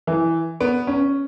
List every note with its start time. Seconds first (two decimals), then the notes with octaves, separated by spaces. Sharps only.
0.07 E3
0.61 B3
0.87 C#4